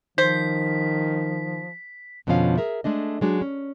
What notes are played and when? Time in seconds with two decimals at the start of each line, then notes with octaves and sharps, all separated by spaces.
0.18 D#3 F3 C5 B6
2.27 F2 B2 D3 F3 C#4 F5
2.58 G#4 A#4 E5
2.84 G#3 A3 D4 D#5
3.21 F#3 G#3 D4 F#4
3.42 C#4